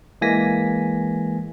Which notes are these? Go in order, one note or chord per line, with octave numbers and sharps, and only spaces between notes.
E3 G#3 A#3 G#5 A#6 B6